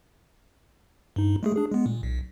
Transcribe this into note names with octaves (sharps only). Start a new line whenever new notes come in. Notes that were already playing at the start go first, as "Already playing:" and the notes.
G2 D#4
G#3 A3 G#4
D4 G#4
G#3 B3
A#2
B1